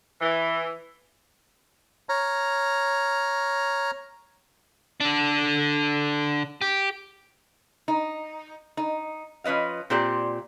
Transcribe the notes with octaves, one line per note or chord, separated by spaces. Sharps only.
E3
C#5 A#5 F6
D3 D4
G4
D#4
D#4
F3 C#4 B4 D#5 F5
A#2 C4 G4 C5 D5